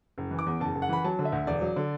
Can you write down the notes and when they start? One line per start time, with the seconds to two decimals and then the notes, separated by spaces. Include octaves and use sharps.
0.18 F#1
0.31 E3
0.39 D6
0.47 E2
0.60 F#1 A5
0.75 F#1
0.82 F#5
0.89 E3 B5
1.04 F#3 A5
1.19 D3
1.25 E5
1.32 D2
1.47 E1 D5
1.61 F#3
1.76 D3